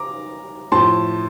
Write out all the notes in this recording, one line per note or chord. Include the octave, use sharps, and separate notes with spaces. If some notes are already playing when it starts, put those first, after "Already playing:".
Already playing: A#5 D6
A2 F3 A5 C6